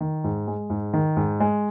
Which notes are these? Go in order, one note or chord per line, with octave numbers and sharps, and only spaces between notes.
D#3
G#2
G#3
G#2
D#3
G#2
G#3